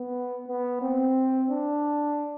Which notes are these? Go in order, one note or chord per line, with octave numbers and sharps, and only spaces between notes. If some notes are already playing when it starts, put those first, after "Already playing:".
Already playing: B3
B3
C4
D4